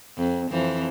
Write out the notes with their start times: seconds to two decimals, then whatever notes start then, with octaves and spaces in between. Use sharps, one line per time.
0.17 F2
0.51 F2 E3 F3